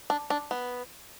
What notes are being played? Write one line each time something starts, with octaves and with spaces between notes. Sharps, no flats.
D4
D4
B3